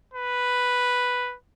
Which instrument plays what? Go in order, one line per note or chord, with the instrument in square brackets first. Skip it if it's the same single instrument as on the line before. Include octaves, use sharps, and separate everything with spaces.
[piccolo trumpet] B4